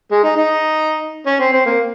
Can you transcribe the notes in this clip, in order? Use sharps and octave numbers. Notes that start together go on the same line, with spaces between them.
G#3
D#4
D#4
C#4
C4
C4
A#3